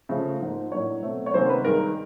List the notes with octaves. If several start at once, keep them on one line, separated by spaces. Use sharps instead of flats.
C#3 F3 A3
G#2 F3 A#3
A2 F#3 A#3 D4 C#5
B2 F#3 A3 C4
C#5
C3 D#3 F#3 A#3 C#4 C5
B4
G2 D#3 G#3 A#4